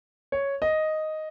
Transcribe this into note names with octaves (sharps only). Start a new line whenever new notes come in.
C#5
D#5